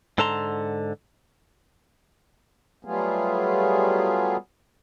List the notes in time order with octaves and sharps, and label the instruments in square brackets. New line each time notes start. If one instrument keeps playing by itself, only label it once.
[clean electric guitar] G#2 D3 A4 A5 A#5 C6
[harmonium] F#3 G3 A3 B3 F4 G#4